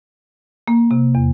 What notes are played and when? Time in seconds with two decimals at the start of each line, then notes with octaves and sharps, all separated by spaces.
0.68 A#3
0.91 C3
1.15 E2